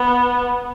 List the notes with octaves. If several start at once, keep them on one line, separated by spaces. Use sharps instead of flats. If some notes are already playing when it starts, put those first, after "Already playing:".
Already playing: B3